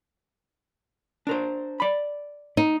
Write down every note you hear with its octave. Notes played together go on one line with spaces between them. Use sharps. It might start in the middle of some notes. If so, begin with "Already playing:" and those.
D4 A#4 C5
D5 B5
D#4